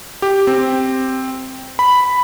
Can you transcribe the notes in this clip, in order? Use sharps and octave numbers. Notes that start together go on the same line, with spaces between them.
G4
C4
B5